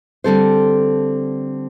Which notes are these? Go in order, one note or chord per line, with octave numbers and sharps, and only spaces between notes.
D3 G3 C4 A4 C5